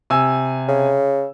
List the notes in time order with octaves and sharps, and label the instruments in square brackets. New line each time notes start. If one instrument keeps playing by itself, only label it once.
[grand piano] C3 G#5 E6
[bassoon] C#3